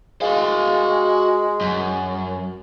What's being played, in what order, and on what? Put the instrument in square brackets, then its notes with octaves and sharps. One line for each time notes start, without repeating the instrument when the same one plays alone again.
[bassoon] G#3 [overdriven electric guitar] F#4 F5
[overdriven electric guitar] F#2